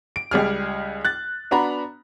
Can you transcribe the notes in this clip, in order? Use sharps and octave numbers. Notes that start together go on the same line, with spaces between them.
D7
C#2 G3 G#4 F6
F#6 A6
B3 D4 F#4 A#5 B5